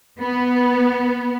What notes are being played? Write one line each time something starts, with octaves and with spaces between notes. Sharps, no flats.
B3